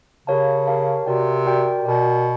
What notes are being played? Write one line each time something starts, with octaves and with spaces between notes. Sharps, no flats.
C#3 G4 A#4 C#5 F5 A5
G4 A#4 C#5 F5 A5
C3 F#4 A#4 D5 G5
F#4 A#4 D5 G5
B2 F#4 A#4 D5 G5